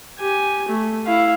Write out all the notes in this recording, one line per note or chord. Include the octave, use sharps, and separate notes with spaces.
G4 G#5
A3
E4 F5